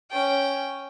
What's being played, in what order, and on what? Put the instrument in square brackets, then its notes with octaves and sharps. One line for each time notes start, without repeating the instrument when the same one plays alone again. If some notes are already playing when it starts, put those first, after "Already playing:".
[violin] C#4 G5